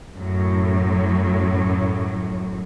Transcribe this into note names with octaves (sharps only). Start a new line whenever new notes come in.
F#2 A2 F#3